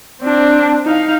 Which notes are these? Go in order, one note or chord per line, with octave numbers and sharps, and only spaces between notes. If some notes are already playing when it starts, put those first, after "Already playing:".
C4 D4
D#4 F5